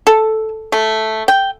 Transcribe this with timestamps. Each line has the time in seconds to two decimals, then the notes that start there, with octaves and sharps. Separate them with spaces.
0.07 A4
0.72 A3
1.28 G5